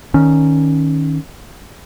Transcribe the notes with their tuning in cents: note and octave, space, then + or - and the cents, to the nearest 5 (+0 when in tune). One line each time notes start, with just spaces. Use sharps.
D#3 +0 C#4 +0